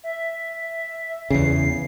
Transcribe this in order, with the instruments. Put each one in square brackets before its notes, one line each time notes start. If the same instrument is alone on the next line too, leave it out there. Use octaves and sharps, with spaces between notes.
[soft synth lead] E5
[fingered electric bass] E2 C#3 [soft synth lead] C7